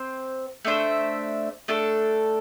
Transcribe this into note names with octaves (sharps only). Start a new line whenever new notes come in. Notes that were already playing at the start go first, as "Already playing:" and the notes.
Already playing: C4 C5
A3 D4 C5 E5
A3 D4 A4